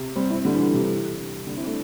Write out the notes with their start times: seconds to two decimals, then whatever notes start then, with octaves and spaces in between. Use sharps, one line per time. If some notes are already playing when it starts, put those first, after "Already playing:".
Already playing: C3
0.16 G3 C4
0.30 C4 E4
0.45 D3 G3
0.54 E3
0.59 D3
0.74 C3 E3
1.47 D3 G3
1.56 C4 E4
1.66 A3 D4